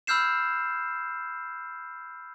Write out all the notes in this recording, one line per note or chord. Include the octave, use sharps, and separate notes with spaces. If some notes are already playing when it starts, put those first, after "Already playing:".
B5 E6 F6 G6 C7 E7